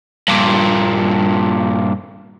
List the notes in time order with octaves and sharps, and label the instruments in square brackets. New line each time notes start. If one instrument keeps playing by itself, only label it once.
[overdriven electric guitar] G2 A#2